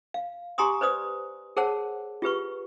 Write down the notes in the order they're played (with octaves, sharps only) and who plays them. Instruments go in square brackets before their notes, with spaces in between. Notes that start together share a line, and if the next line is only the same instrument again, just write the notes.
[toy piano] F5
G4 G#5 A#5 C6 D#6
B4 C5 D5 D#6
G#4 A#4 C5 C#5 F#5 A5
F4 G4 B4 C#6